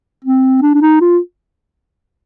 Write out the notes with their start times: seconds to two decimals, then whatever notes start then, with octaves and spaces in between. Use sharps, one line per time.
0.24 C4
0.62 D4
0.75 D4
0.82 D#4
1.01 F4